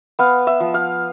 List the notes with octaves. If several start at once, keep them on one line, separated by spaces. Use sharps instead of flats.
B3 F5
E5
F3
F5